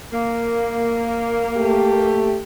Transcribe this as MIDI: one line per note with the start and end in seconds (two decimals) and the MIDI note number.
0.13 2.27 58
1.57 2.40 57
1.57 2.40 67